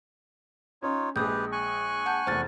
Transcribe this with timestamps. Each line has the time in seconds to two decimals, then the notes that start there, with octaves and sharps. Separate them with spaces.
0.83 C#4 D#4 F4 C#5
1.16 A#1 G#3 G4 G#4 B4 D#6 G6
1.52 G#5 C#6 F#6
2.06 F#5 A5 G6
2.27 F1 E2 C5 F6 A6